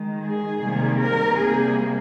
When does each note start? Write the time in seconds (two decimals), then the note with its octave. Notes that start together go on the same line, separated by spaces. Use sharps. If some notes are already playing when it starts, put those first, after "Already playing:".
Already playing: D#3 G#3
0.24 G#4
0.61 C3 D#3 G3 A#3
0.99 A#4
1.35 C3 G3 A#3 G#4